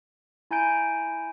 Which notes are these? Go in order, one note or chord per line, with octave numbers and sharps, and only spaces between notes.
E4 G#5 A#5 G6 D7